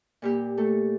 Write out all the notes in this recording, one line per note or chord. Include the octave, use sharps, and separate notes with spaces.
A#2 G3 G4
A3 A4